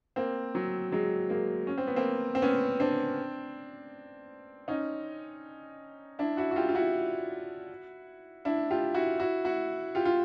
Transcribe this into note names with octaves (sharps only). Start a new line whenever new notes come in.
A#3 C4
F#3
F#3 G#3
G#3 A#3
C#4
C4
B3
A#3 C4
C4
B3 C#4
C4 D4
C#4 D#4
D4 E4
E4 F#4
F#4
F4 G4
F4
E4 F#4
D4 E4
F4 G4
E4 F#4
E4 F#4
E4 F#4
F4 G4
F4